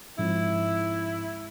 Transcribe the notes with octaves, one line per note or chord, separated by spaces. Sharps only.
G#2 F3 G#3 C4 E4